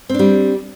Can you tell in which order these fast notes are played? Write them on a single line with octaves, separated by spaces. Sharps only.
C4 D4 G3